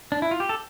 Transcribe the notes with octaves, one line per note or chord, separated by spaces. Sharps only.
D4
E4
F4
G4
A4